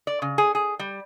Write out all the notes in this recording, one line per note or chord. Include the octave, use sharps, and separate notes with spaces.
D5
C#3
G#4
G#4
G3